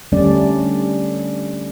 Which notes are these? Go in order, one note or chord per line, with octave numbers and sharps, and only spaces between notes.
D3 G3 A3 C#4 D4 D5